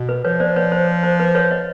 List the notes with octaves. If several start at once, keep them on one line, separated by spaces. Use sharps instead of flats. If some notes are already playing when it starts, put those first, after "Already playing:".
Already playing: B2
B4
F3 B4 C#5
C5 D5
B4 C#5
C5
C5
B4
B4 C#5
C#5 D#5